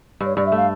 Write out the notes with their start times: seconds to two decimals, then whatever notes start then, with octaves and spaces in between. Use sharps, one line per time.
0.21 G2
0.26 C#5
0.36 G2 D5
0.47 E5
0.52 A3
0.57 F5